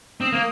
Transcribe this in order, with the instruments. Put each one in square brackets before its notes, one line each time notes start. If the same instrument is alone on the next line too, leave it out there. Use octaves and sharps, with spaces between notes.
[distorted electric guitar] C4 [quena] D#6
[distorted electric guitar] A#3